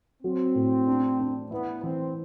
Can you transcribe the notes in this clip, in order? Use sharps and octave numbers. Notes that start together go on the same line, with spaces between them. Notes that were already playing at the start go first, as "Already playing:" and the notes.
F#3 C4
A2
D4
D4
B3 E4
E3 C4